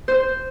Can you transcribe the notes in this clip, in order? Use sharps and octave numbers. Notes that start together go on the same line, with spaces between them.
C5